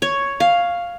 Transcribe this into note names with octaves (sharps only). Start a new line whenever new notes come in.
C#5
F5